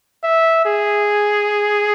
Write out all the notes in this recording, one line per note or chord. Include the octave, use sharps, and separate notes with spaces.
E5
G#4